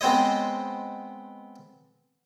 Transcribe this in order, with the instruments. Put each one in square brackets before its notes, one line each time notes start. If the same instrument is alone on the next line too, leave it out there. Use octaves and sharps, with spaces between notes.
[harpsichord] G#3 B3 C4 C5 C#5 D#5